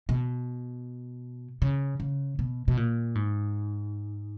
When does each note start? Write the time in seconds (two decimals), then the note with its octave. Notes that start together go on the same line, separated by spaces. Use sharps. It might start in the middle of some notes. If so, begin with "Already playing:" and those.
0.09 B2
1.62 C#3
2.00 C#3
2.39 B2
2.68 B2
2.77 A#2
3.15 G#2